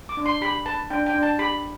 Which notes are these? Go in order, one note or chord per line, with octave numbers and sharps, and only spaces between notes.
D6
D4
C6
G4 B5
B4 A5
D4 G5
G5
D4
A5
G4 B5